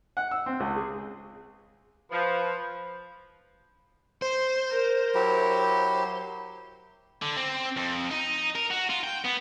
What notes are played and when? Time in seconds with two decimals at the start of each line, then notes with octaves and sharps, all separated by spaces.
0.17 F#5
0.31 E6
0.46 C4
0.60 C#2
0.76 G#4
2.12 F3 B4
4.22 C5 C6
4.70 A#4
5.14 F#3 E4 G4
7.22 D3
7.37 C4
7.76 F2
8.10 D#4
8.55 A#4
8.70 F#4
8.89 F4
9.03 G5
9.24 B3